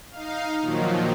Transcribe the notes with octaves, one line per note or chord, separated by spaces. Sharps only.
D#4 F5
A#2 D#3 F3 F#3